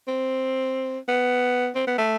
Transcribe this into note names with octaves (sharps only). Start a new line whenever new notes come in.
C4
B3
C4
B3
A3